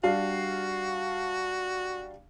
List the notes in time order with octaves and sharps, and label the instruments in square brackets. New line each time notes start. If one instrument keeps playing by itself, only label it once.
[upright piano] G3 D4 F5 [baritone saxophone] F#4